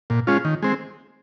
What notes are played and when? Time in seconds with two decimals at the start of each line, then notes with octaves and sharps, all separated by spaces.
0.10 A#2
0.27 G#3 C#4 F4
0.45 D#3
0.62 G#3 C4